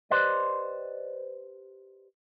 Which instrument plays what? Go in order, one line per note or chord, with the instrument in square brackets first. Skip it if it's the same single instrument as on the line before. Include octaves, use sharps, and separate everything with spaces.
[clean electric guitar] G4 B4 C5 D5 D#5